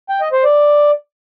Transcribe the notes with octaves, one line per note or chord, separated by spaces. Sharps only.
G5
D#5
C5
D5